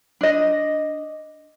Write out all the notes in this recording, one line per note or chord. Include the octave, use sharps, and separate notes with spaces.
D4 D#5